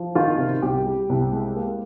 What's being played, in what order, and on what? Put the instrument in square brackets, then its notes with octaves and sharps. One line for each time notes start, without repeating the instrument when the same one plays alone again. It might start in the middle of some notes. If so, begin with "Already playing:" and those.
Already playing: [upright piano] F3
D#3 F4
C3
C2 G4
G3
C2
G#3
A#3